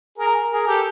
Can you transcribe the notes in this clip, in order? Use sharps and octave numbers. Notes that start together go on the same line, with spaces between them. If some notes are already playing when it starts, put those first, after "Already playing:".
G#4 A#4
G#4 A#4
G4 A4